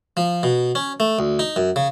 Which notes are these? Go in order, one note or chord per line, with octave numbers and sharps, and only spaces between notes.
F3
B2
C#4
A3
D2
D#4
F#2
C#3